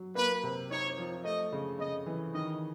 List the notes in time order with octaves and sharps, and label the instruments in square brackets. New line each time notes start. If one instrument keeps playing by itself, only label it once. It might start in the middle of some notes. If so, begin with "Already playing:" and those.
Already playing: [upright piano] F#3
[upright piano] A#3 [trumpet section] B4
[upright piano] C3
[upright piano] D#4 [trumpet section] C#5
[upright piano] F3
[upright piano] A3 [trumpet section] D#5
[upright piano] C#3
[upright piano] C#3 [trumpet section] D#5
[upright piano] E3
[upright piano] D#3 [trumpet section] D#5